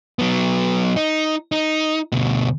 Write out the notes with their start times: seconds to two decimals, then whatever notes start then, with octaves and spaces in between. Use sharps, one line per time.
0.19 F#3 B3
0.96 D#4
1.52 D#4
2.12 D2 B2